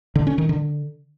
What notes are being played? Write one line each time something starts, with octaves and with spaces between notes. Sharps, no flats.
D3
C#4
D#3
D3